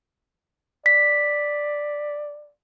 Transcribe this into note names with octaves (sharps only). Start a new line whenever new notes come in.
D5 B6